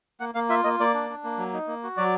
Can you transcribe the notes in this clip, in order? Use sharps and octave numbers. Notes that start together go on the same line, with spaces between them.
A#3 F#5
A#3 F5
F4 E5
A#3 D#5
A#3 D5
D4
D4
A#3
F#3
D#4
A#3
F#4
F#3 D5